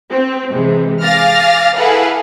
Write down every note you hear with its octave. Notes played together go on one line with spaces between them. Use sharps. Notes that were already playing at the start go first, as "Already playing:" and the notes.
C4
C3 E3 G#3
F5 G#5 D6 F6 A6 A#6
E4 G#4 A4 B4 F5 F#5